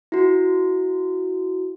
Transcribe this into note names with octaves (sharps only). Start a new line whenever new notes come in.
E4 F#4